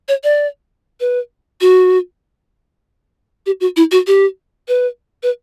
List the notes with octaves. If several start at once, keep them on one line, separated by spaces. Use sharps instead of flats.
C#5
D5
B4
F#4
G4
F#4
E4
F#4
G4
B4
B4